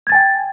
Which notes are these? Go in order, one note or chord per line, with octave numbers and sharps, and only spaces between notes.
G5 G#5 G#6 A6